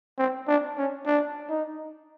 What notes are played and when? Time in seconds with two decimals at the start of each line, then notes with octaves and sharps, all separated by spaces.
0.18 C4
0.48 D4
0.78 C#4
1.06 D4
1.49 D#4